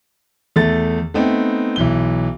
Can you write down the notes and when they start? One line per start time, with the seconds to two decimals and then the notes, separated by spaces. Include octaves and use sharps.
0.56 E2 A3 A6
1.14 A3 B3 C4 D#4
1.76 B1 E3 G7